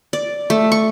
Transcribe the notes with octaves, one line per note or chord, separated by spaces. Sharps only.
D5
A3
C#6